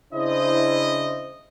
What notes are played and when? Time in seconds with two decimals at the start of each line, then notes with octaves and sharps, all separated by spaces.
0.14 C#3 D4 E4 C5 D#5